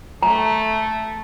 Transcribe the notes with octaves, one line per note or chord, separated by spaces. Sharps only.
A3 A#5